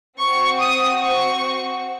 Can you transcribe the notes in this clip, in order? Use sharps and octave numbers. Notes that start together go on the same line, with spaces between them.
C4 F#4 C#6
D#6
C#6